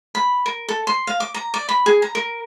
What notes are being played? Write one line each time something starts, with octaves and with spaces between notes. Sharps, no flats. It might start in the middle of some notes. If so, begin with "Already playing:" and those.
B5
A#4
A4
C6
F5
D6
A#5
D5
B5
G#4
A#5
A#4